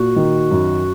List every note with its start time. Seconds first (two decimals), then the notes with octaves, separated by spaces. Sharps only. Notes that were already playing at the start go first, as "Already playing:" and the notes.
Already playing: A#2 F#4
0.16 D#3
0.51 F#2